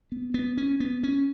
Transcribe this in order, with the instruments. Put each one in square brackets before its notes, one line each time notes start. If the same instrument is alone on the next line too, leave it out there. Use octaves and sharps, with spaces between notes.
[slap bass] B3
B3
C#4
B3
C#4